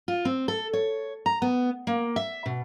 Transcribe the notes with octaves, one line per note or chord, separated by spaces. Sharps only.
F4
C4
A4
C#5
A#5
B3
A#3
E5
B2